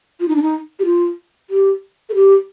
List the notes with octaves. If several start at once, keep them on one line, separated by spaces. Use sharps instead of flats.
F4
D#4
D4
D#4
G4
F4
G4
A4
G4